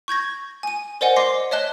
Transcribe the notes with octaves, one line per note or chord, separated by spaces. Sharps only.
C#6 G6 G#6 A#6
G#5 D#7
A#4 C5 D5 D#5 F#5 G#5
D#5 C6 D6 A#6 C7
C#5 D#5 E5 A5 F#6 G7